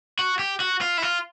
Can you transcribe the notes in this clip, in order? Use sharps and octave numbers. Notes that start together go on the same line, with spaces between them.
F#4
G4
F#4
F4
E4
F4